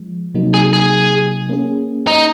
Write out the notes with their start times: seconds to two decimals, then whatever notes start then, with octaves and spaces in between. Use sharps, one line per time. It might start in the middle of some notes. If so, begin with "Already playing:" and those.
Already playing: F3 G#3
0.34 C3 F#3 A#3 D#4
0.54 G#4
0.73 G#4
1.49 A#3 C#4 G#4
2.07 D#4